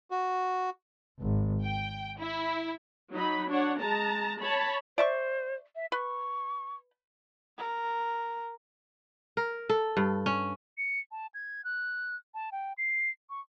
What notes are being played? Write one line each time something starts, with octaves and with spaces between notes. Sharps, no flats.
F#4
G#1
G5
E4
F#3 D#4 B5
D4 C#5 F#5
G#3 A5 A#5
C#5 A5 B5
C5 D5 E5 C#6
E5
B4 C#6
A#4
A#4
A4
G2
C#4
C#7
A5
G#6
F#6
A5
G5
C7
C#6